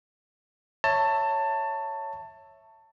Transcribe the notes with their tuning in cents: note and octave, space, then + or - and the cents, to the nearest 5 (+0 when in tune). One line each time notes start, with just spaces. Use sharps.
C#5 +0 E5 +0 A5 +20